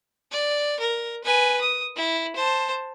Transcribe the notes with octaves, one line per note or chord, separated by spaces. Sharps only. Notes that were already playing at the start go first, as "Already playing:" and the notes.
D5
A#4
B4 G#5
D#6
E4
C5 A5